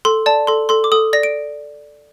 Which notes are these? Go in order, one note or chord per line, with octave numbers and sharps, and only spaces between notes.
A4 C6
D5 A5
A4 C6
A4 C6
D6
A4 D#6
D5 A#6
D7